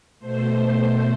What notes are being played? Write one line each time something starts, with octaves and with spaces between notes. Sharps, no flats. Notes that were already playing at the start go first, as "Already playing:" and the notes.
B2 A3 C5